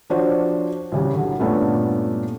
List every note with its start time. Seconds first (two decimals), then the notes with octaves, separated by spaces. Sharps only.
0.10 F3 D4 F#4 C5 C#5
0.92 C2 C#3 G3
1.14 D3 F#3
1.39 G2 A#2 A3 B3 C#4 D4